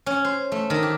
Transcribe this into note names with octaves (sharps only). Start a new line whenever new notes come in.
C#4
C5
A3
D#3
G4